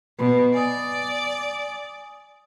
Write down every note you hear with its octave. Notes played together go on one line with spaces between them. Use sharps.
B2 B4 B5
D5 G#5 D#6